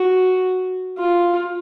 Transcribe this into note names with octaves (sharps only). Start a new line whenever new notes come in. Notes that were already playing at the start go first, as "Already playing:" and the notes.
Already playing: F#4
F4